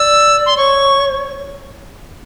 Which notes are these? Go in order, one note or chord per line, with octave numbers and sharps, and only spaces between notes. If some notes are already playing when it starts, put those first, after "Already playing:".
Already playing: D5 E6
C6
C#5 C#6